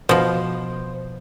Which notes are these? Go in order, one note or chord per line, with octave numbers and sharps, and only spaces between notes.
B2 F3 C5